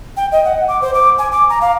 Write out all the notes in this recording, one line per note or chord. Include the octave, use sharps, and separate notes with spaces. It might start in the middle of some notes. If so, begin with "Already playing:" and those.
G5
D#5
F#5
D6
C5
D6
G#5
D6
A#5
F5